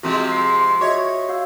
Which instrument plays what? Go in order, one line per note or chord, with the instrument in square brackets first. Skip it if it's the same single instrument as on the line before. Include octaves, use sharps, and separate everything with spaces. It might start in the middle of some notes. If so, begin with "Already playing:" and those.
[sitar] C3 F3 G#3 [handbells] C4 F#4
[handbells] C7
[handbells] F#4 D#5 E5 [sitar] C#5
[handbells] F#4 F5 E6